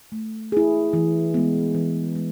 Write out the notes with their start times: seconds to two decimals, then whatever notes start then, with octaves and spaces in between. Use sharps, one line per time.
0.12 A3
0.52 E4 G#4
0.93 E3
1.34 G#3 B3
1.75 E3
2.15 G#3